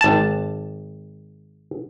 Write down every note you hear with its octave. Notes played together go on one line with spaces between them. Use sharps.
G#1 A5